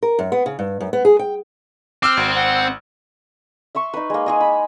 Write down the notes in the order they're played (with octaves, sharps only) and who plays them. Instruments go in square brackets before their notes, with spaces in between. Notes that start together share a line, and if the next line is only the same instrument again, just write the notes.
[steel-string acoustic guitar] A#4
F#2
B3
C#3
G2
F#2
B3
G#4
G5
[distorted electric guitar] C4 [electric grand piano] D6 E6 F6
[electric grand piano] G#1 [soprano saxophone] F#4
[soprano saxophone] F#5
[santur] E5 C6 C#6
D#4 B4
G#3 A#3
G#3 G#4 D#5
B5